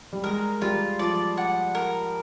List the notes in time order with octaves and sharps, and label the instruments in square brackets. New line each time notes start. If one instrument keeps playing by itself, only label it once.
[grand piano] G3
[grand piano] G#3 [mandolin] A#4
[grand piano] G3 [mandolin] F4
[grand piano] F3 [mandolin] D5
[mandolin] F#5
A#4